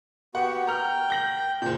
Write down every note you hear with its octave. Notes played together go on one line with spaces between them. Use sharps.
B3 F#4 G4 F#5
G5 A#5 F6
G6 A#6 F#7
F#1 A#2 G6